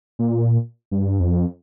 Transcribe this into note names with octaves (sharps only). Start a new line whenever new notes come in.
A#2
G2
F2